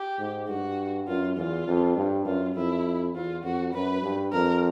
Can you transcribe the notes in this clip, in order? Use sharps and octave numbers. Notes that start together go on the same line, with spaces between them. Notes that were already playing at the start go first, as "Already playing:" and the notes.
Already playing: G4
G#2
G2 F#4
F#2 F4
E2 F4
F2
G2
F#2 F4
F2 E4
E2 F4
F2 F#4
F#2 B4
G2
F2 A#4